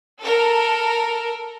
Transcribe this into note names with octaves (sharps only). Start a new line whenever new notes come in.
A4 A#4